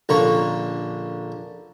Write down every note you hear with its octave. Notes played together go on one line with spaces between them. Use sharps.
A#1 D3 A#3 C#4 C#5 C#6